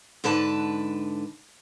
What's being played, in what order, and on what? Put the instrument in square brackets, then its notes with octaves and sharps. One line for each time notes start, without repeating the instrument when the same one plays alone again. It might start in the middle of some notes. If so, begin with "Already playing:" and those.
[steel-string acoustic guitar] G#2 D3 B4 A5